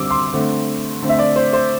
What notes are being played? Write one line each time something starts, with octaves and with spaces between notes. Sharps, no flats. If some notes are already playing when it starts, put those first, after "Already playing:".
Already playing: D3 G3 C4 D6 E6
C6
D3 A3 C4
D3 A3 C4
E5
D5
C5
C5